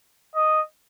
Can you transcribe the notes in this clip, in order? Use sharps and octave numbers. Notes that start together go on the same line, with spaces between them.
D#5